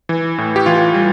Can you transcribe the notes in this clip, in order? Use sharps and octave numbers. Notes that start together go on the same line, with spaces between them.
E3
A2
G4
E3 F4
G3